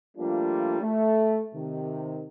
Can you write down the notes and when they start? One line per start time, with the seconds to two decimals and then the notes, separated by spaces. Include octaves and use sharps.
0.18 F3 G3 A3 A#3 D4 F4
0.81 A3
1.55 C3 D#3